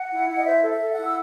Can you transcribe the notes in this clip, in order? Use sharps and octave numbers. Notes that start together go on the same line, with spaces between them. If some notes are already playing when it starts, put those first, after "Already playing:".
Already playing: F#5
E4
E4
D#5
C5 E5
A4
E5
A4
F#5
E4
E6